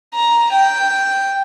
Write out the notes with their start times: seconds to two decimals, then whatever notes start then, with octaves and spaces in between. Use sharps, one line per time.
0.15 A#5
0.53 G5